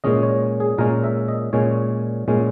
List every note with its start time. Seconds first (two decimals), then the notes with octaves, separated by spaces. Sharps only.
0.04 A#2 G#3 C#4 D#5
0.23 C#5
0.60 G#4
0.78 A#2 G#3 C#4 A#4
1.04 E5
1.28 D#5
1.53 A#2 G#3 C#4 C#5
2.28 A#2 G#3 C#4